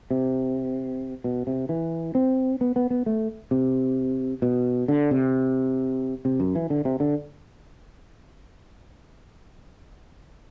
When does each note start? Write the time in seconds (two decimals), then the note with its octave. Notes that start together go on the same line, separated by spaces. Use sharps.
0.11 C3
1.24 B2
1.47 C3
1.69 E3
2.15 C4
2.61 B3
2.76 B3
2.90 B3
3.06 A3
3.51 C3
4.42 B2
4.88 D3
5.11 C3
6.25 C3
6.40 F#2
6.55 E3
6.70 D3
6.85 C3
7.00 D3